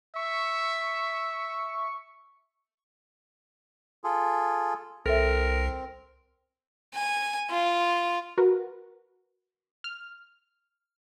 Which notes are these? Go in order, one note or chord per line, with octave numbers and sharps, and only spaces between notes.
E5 C#6
F4 G#4 A4
C2 C4 A4 A#4 E5
G#5
F4
F#4 A#4 B4
F6